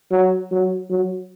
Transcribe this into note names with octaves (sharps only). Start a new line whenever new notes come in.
F#3
F#3
F#3